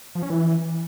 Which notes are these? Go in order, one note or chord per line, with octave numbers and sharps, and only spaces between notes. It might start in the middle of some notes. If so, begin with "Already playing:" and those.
F3
C#4
E3